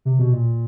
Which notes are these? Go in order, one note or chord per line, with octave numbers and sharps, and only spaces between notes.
C3
B2
A#2